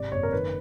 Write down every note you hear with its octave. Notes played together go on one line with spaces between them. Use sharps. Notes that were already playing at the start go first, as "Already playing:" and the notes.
Already playing: G#1 C3 D5
F#1 C#5
A#4
D#3 B4